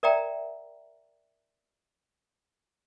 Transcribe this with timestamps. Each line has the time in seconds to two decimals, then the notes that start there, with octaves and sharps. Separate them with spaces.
0.03 A#4 D5 E5 G5 A#5